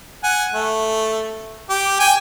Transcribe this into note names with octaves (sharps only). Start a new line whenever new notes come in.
F#5 G#5
A3
G4
G5 G#5